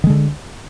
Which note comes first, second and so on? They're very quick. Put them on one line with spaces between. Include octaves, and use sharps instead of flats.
D#3 G#3 D3